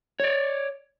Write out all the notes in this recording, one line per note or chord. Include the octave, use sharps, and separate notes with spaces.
C#5 D5